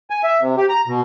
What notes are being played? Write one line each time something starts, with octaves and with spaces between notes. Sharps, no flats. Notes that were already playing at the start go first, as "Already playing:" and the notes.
G#5
E5
C3
G4
A#5
B2